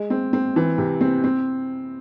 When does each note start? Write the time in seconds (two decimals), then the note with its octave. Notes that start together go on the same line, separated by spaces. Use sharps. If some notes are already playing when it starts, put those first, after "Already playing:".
Already playing: G#3
0.10 C4
0.33 C4
0.56 E3
0.78 C3
1.01 C4
1.24 C4